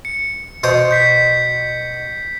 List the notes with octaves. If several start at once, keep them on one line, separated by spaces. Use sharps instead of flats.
C#7
B2 C5 D#6
G6 B6 C7